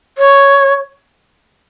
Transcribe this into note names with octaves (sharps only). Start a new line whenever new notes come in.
C#5